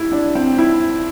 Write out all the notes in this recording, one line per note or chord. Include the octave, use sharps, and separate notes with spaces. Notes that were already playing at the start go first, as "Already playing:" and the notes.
Already playing: E4 G4
D4
C4
E4